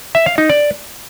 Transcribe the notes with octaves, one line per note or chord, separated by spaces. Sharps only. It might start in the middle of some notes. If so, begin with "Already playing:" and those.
E5
F5
D#4
D5